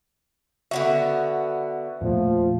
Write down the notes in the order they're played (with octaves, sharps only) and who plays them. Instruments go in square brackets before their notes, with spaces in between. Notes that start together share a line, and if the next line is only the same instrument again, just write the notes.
[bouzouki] D3 B3 F#4 [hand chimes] E5
[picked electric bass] E2 A#2 A3 [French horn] F3